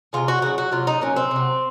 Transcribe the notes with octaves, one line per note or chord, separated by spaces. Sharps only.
C3 F3 G#3 F4
F#4
C#3 F#3 F#4
F#4
C3 F#3 F4
D#4
A#2 F#3 C#4
C4
C3 F#3